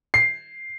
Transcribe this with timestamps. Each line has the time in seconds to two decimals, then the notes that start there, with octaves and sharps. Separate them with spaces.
0.14 C7